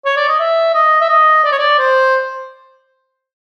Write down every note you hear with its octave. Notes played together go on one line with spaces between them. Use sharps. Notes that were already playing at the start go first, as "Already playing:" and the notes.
C#5
D5
D#5
E5
D#5
E5
D#5
D5
C#5
D5
C5